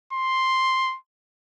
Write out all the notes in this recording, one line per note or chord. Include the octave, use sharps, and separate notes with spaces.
C6